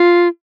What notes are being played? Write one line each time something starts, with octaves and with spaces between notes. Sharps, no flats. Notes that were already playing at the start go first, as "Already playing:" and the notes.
Already playing: F4